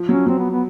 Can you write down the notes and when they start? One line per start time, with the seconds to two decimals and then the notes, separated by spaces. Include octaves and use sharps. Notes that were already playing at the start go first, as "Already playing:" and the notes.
Already playing: F3
0.09 F#3 C#4
0.27 F#3 C4
0.39 B3
0.50 B3